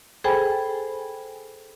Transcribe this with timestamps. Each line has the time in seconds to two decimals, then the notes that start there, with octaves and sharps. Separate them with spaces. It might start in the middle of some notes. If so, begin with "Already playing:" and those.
0.24 G#4 A4 C5 G5 G#5 B5